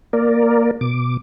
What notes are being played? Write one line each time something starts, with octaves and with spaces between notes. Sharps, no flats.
A#3 A#4 D5
B2 D6